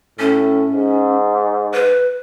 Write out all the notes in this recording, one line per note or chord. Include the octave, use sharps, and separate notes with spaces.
A2 C#4
G#2
B4